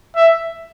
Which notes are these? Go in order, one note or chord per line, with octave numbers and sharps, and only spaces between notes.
E5